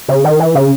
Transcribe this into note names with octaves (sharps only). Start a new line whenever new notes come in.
C#3
D#3
E3
C#3